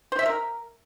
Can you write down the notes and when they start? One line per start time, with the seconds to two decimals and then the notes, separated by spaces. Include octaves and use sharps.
0.12 C5
0.19 E5
0.26 A#4